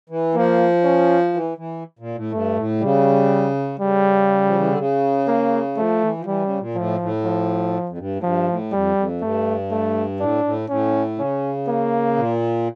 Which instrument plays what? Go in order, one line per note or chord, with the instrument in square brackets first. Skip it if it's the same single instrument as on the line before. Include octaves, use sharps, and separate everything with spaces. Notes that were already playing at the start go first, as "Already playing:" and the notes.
[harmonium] E3
[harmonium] F3 [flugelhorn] A#3
[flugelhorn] C#4
[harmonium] E3
E3
A#2
A2
[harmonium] G2 [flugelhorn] A3
[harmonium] A2
[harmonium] C#3 [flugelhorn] G3
[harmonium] C#3 [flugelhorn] G3
[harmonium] F3
E3
D3
C#3
[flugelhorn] A#3
[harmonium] F3 [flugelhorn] A3
[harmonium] E3
F3
[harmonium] E3 [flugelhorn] G3
[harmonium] C#3
A#2
[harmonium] A2 [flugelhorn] F3
[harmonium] A2
[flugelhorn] F3
[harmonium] F2
G2
A2
[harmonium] G2 [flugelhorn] F3
[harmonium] A2
[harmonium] F2 [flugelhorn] G3
[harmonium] F2
[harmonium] G2 [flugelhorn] A3
[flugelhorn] A3
[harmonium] A2 [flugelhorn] D4
[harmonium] A2
[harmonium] A2 [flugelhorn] C#4
[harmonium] C#3 [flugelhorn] C#4
[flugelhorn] A#3
[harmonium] A#2